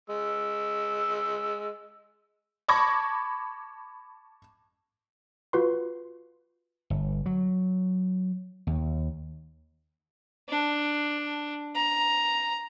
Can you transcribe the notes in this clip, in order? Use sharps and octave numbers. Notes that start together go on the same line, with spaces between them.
G#3 E6
A5 B5 C#6 D6 G#6 A#6
F4 F#4 B4 C6
G1
F#3
D#2
D4
A#5